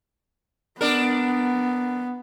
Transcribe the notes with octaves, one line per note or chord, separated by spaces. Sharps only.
B3 D4 A#4